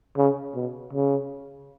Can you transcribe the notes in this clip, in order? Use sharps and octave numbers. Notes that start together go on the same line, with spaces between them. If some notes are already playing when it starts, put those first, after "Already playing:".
C#3
B2
C#3